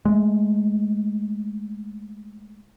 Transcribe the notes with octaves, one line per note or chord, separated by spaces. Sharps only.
G#3 A3